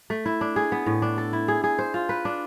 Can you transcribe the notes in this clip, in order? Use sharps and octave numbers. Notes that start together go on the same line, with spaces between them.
A3
E4
D4
G#4
B3
A2
D4
A4
E4
G#4
G#4
C5
F4
B4
D4